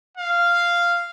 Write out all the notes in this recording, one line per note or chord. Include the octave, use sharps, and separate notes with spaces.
F5